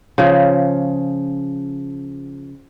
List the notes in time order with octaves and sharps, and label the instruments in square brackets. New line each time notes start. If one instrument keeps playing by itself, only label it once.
[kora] C#3 F3